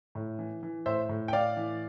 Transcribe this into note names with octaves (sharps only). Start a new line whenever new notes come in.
A2
E3
E3
A2 C5 E5
A2
G5
A2 D5 F5
E3